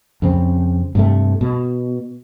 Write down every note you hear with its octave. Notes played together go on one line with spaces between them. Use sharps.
F2 C#3 C4
G2 C3 A3
B2